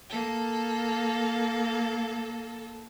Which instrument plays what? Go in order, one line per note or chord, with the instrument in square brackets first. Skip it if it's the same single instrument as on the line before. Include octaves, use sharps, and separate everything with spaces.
[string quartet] A#3 A4